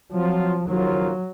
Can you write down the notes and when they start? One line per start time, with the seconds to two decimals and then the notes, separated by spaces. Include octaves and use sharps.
0.12 F3 F#3 C4 F4
0.67 D#2 C#3 F3 F#3 A#3 F4